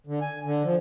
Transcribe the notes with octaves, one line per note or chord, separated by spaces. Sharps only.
D3
G#5
D3
F3